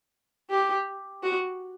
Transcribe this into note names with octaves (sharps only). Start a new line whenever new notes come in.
G4
F#4